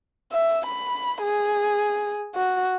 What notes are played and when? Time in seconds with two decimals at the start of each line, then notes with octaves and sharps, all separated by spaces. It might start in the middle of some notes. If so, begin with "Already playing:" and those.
0.32 E5
0.66 B5
1.23 G#4
2.35 F#4